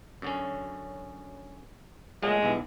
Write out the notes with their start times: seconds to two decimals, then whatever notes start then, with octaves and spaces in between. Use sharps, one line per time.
0.22 F#2 D3 C#4
2.23 A#2 F#3 G#3 A3
2.42 B1 G2 E3